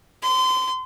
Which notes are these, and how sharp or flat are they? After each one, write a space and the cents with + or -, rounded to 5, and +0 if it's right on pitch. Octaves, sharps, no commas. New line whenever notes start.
C6 -30